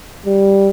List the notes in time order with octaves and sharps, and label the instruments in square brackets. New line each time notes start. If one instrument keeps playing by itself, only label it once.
[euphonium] G3